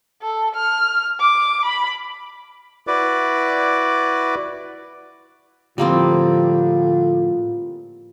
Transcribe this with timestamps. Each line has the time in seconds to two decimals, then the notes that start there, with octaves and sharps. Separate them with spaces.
0.22 A4
0.55 F6
1.21 D6
1.65 B5
2.87 E4 F#4 B4 D5 D6
5.78 A2 D3 F3 G3 A#3 C4 F4